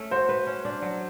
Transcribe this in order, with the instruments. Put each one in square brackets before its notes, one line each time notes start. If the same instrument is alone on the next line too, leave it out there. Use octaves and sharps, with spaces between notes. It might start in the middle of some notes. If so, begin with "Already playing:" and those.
Already playing: [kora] A3 C#4
[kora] F#4 [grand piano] C5
[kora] B4
C#4
D4
F#3